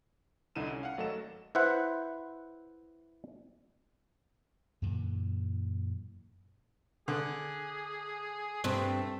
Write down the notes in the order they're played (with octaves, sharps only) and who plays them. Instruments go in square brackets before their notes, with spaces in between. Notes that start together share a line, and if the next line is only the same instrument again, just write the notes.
[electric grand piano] C2 D3 D#4 E4 D#7 E7
C#4
F5 F#5
G#1 F#3 A3 A4 D#5 E7
[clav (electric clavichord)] E4 B4 C5 E5 F#5
[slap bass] F#2 A#2 D3 E3
[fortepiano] D3 [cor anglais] G#4
[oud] G2 C4 [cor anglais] A3